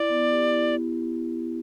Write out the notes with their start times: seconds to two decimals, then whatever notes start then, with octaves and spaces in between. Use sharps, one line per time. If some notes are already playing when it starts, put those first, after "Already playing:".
Already playing: E4 D5
0.10 B3
0.30 G4
0.50 E4